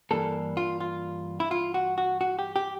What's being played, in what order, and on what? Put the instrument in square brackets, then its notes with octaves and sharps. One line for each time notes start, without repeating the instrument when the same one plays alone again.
[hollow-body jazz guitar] G2 E3 G3 A#3 D4 A4
F4
F4
E4
F4
F#4
F#4
F#4
G4
G4